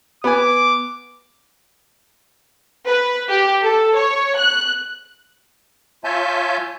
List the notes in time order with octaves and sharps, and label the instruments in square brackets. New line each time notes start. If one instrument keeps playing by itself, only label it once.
[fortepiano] B3 B4 G#5 [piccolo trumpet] D6
[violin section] B4
G4
A4
C#5
F#6
[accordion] F4 C#5 E5 G#5 A5 G6